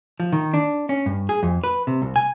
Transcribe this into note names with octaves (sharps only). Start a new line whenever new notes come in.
F3
D#3
D4
C#4
G2
G#4
F2
B4
C3
C2
G#5